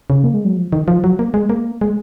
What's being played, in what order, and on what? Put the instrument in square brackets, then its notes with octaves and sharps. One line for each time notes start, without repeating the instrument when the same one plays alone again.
[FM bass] C#3
A#3
G#3
F#3
F3
D#3
F3
F#3
A#3
G#3
A#3
G#3